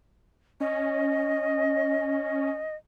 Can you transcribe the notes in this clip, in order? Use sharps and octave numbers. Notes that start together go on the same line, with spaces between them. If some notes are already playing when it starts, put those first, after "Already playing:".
C#4 D#5